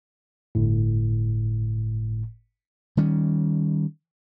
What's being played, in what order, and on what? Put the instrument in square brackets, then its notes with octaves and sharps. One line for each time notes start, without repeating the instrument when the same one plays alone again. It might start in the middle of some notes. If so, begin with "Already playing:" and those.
[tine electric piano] G1 A2
[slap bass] D#3 G3 C#4